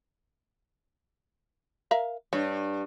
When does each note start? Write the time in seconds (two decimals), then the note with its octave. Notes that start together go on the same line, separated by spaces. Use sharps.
1.91 A#4 E5 F5
2.33 G2 C#5